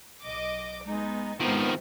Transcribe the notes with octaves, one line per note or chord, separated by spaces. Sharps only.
B1 D#5 D6
G#3 B3 D#4
G#2 C3 D#3 F3 B3